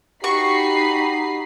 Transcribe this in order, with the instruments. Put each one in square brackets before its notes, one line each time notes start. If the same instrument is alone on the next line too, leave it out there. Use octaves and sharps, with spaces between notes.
[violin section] D#4 B5 C7 [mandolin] F#4 C#6 [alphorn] G4